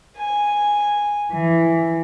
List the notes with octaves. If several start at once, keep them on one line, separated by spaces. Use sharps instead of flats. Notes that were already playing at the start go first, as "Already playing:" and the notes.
G#5
E3